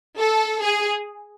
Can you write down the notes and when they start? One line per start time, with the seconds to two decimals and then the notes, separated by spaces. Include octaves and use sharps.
0.19 A4
0.62 G#4